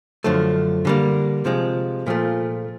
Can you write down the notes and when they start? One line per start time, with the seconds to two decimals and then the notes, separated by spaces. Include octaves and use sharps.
0.24 F#2 D3 F3 A3
0.85 D3 G3 A#3
1.45 C3 F3 G#3
2.06 A#2 F3 A3